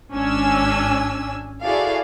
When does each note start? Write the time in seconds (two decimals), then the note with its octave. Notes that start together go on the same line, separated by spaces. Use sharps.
0.13 G#1 C#4 D4 G#5 E6
1.63 E4 F#4 G#4 A4 D5 F5